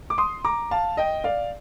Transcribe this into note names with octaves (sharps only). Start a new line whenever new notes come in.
D6
C6 D#6
A#5 D6
F5 A5
D#5 G5
D5 F5